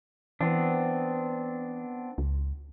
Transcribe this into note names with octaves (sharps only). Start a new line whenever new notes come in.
E3 B3 C4 D4
C#2